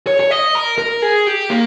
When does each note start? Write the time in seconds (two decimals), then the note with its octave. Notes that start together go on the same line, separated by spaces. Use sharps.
0.07 C#5
0.20 C#5
0.31 D#5
0.55 A#4
0.78 A#4
1.02 G#4
1.27 G4
1.50 A#3